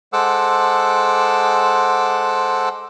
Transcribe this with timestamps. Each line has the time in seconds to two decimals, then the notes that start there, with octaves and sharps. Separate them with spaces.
0.13 G#3 A4 C5 F#5 D6 E6